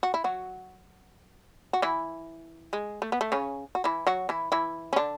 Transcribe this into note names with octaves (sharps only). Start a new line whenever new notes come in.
F#4
E4
F#3 F#4
F#4
E3 E4
G#3
A3
B3
A3
C#3 C#4
F#4
E3 E4
F#3 F#4
E3 E4
E3 E4
C#4
D3 D4